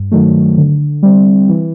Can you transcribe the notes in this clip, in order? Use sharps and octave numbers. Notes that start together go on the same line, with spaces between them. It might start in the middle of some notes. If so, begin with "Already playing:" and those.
Already playing: G2
D#3 F#3 A3
D3
G3 C4
E3